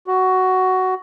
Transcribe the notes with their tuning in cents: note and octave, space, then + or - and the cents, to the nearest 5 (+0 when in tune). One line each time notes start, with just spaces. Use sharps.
F#4 +10